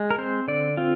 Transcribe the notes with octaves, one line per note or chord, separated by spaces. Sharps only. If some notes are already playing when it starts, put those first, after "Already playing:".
Already playing: G#3
A#4
C4 C5
D3 D5
C4 F4